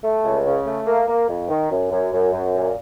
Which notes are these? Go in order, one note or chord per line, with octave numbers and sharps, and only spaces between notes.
A3
C#2
C#3
A3
A#3
A#3
F2
D#3
F#2
F#2
F#2
F#2
A#2